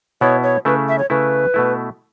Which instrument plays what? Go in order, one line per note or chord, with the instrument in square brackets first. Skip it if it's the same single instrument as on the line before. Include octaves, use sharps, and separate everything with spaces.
[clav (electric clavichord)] B2 B3 E4 [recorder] C#5
[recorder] C#5
[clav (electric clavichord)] C#3 A3 E4 [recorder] B4
[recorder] E5
C#5
[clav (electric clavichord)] C#3 A3 E4 [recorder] B4
[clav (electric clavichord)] B2 A3 E4